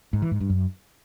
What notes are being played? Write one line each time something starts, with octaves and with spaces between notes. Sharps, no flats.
G#2
E3
G#2
G2
F#2